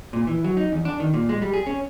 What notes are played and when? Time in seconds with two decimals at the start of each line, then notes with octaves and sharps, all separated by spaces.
0.13 A#2
0.27 E3
0.44 F#3
0.57 D#4
0.72 E2
0.85 D4
1.00 D#3
1.14 A#2
1.29 G#3
1.42 G3
1.54 G#4
1.67 C#4